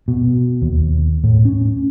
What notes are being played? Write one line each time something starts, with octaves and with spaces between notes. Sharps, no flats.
B2
D#2
A2
C#4